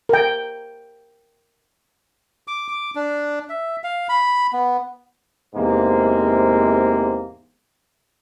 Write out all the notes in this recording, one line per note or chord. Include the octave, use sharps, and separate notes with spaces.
A#4 G5
D6
D6
D4
E5
F5
B5
B3
E2 G#2 C3 A#3